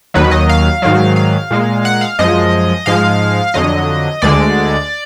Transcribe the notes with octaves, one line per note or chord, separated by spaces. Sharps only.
D#2 D#3 F#3 B4
D#5
F5
G#2 D#3 F#3
F5
A#2 G#3
F#5
F5
F#2 F3 G#3 D#5
G#2 F3 G#3 F5
F2 D3 F#3 D#5
D2 D3 G#3 D5